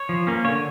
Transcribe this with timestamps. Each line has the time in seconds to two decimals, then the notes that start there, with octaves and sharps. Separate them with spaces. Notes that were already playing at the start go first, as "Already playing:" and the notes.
Already playing: C#5
0.09 F3
0.27 A#3 C#4
0.45 D3 C#5